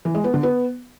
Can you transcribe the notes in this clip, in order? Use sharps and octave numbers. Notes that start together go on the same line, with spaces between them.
E3
G#3
B3
D3
B3